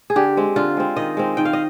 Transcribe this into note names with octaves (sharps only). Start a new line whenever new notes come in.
G#4
D3 G4
G#3 C4
D3 F4
G#3 C4
D#3 D#5
G#3 C4
D#3 G5
F5
D#5